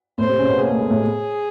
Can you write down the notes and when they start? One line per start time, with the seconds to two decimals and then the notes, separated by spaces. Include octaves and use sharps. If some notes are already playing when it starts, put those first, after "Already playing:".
0.18 A2 A3 C5
0.28 C3 C4
0.39 C#3 C#4
0.49 B2 B3
0.59 A#3 G#4
0.69 A3
0.80 G#3
0.90 A2 A3